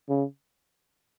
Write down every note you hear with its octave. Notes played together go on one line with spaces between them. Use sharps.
C#3